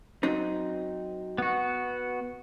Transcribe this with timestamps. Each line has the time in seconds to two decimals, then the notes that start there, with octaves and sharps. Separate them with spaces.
0.23 F#3 C4 D#4
1.38 B3 F#4